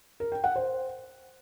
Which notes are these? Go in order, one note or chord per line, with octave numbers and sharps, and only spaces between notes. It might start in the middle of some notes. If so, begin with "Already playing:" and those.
A#4
G5
F#5
C5